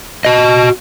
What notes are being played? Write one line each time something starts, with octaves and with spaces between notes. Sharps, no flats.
F#4 D#5